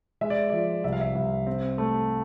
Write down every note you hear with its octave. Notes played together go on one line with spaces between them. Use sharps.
G#3 E5
D5
F3 D5
C2 E5
F5
E5
C2
C4
A3